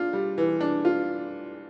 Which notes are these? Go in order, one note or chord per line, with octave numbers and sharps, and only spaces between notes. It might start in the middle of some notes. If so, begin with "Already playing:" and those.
Already playing: D4 F4
G3
E3
D4
F4